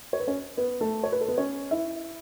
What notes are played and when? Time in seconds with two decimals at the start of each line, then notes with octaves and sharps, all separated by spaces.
0.13 C#5
0.20 B4
0.27 C#4 C#5
0.57 B3 B4
0.81 A3 A4
1.03 C#5
1.12 B4
1.21 A4
1.28 B3 B4
1.38 C#4 C#5
1.71 E4 E5